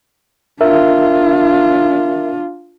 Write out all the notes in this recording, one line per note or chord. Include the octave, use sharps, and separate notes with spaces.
D4 F4 A#4 E5